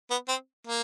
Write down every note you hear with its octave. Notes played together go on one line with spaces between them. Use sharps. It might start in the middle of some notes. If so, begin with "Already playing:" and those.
B3
C4
A#3